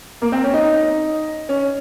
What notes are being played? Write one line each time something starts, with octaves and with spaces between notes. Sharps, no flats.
A#3
C4
C#4
D#4
C#4